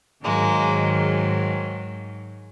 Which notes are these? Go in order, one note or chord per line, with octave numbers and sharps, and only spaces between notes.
G#2 D#3 F#3 G#3 A#3